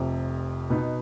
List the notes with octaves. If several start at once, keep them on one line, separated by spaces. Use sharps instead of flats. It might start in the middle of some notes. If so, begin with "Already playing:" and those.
Already playing: F1 F2 C3
B2 B3 D#4